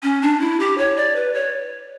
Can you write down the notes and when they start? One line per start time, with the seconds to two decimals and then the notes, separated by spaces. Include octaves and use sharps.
0.03 C#4
0.22 D4
0.40 E4
0.60 G4
0.78 C#5
0.97 D5
1.16 B4
1.34 C#5